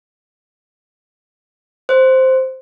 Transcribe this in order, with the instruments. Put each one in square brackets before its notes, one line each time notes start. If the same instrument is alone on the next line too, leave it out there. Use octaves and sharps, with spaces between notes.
[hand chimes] C5